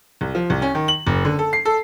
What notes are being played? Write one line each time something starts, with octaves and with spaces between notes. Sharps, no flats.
C2
F3
C2
C#4
D#3
F#7
F#1
D3
A4
C7
A4